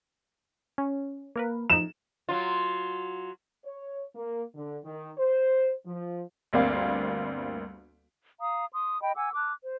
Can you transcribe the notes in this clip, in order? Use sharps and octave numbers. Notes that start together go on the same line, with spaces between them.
C#4
A#3 A#4 B4
F3 D#4 E7
F#3 F4
C#5
A#3
D3
D#3
C5
F3
G1 D2 G3 A#3 C4 F5
F5 A#5 D#6
C6 D#6
D#5 G5 B5
F#5 G#5 D6 E6
A5 D6 F6 F#6
C5